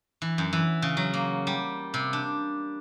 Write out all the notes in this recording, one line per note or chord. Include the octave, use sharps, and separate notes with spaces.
E3
F#2
E3
C#3
F#3
A#3
G3
C3
D4